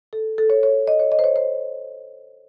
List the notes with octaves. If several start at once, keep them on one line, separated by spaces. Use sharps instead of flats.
A4
A4
C#5
C#5
D#5
C#5
D#5
C5
C#5
C5